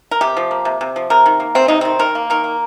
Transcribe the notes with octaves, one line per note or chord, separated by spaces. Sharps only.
A#4
C3 G4
F3
A#3
C3
C3
F3
C3 A#4
D#3
A#3
C3 C4
C3 D#4
D#3 C4
D#3 A#4
A#3
D#3 A#4
A#3